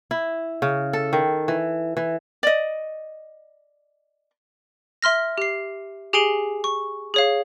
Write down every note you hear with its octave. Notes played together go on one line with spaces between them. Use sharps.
E4
C#3
A4
D#3
E3
E3
D5 D#5
E5 C6 F6 A#6
G4 C7
G4 G#4 G#5 C7 D7 G7
C#6
G#4 C#5 F5